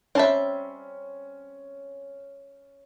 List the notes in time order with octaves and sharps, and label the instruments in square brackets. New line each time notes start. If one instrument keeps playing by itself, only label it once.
[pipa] G3 A5 [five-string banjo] C4 E5 [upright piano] C#4